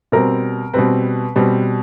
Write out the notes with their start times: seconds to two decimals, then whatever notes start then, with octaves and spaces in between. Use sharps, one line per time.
0.12 B2 G3 C4 A#4
0.74 B2 G3 C4 B4
1.36 B2 G3 C4